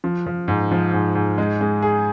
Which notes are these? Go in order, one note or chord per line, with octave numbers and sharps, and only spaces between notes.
F3
F3
G#2
F3
G#2
G#2
G#3
G#3
G#4